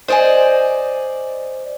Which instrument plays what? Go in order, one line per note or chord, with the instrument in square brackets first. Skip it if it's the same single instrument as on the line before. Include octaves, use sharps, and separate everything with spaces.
[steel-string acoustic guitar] C5 D5 D#5 F5 G#5